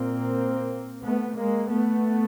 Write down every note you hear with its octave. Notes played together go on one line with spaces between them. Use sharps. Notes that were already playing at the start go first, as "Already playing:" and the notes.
Already playing: A#2 A#3 C4
A3 B3
G#3 A#3
A3 B3